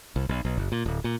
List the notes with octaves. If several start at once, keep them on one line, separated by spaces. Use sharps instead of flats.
C2
B1
B1
F#1
A#2
D1
A#2